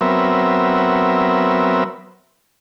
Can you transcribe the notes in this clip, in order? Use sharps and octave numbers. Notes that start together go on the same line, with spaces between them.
F#3 B3 C4 A#4 E5